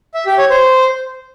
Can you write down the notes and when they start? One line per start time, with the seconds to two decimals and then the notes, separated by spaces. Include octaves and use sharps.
0.14 E5
0.26 G4
0.38 C#5
0.50 C5